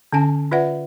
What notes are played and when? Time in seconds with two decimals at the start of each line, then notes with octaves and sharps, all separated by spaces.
0.13 D3 C#4 G#5 A5
0.52 F4 B4 D5 E5 F#5